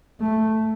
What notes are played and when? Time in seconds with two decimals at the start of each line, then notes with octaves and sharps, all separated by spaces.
0.20 A3